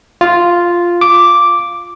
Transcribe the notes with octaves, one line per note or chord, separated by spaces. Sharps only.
F4
D6